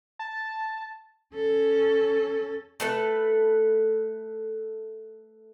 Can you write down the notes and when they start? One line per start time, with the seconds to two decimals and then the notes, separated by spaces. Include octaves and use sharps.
0.19 A5
1.35 C#4 A4
2.80 A3 A4 B4